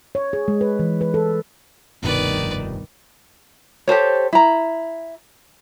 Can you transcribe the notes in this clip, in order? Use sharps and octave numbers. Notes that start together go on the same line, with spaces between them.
C#5
G#4
G#3
B4
E3
B4
A4
F1 C2 G2 B2 D#3 B4 D5
G4 A4 C5 C#5
E4 A#5